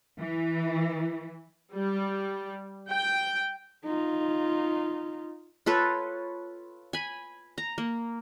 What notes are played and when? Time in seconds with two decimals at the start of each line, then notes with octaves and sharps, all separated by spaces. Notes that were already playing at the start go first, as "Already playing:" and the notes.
0.19 E3
1.74 G3
2.90 G5
3.85 D#4 F4
5.66 F4 A4 B4 C#5
6.93 G#5 B5
7.58 A#5
7.78 A#3